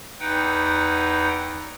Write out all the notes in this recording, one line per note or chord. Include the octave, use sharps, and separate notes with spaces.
E2 D#4 B4 F#5 G5